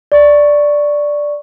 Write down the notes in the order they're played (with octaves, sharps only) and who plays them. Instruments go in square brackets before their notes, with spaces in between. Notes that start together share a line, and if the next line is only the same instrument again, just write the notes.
[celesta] D5 C#6